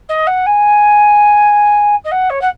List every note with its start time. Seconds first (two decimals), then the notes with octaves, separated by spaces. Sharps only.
0.09 D#5
0.27 F#5
0.46 G#5
2.04 D#5
2.11 F#5
2.30 C#5
2.41 F#5